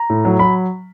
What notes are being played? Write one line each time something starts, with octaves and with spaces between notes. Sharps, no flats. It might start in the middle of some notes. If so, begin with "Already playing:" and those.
Already playing: A#5
A2
F#3
F#3 B5